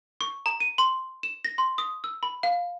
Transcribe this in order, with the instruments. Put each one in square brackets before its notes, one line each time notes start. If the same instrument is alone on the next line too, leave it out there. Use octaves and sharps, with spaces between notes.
[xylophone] C#6
A#5
D#7
C6
E7
A#6
C6
D#6
E6
B5
F5